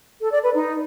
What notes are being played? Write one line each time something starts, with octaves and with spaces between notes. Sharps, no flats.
A4
D5
B4
D#4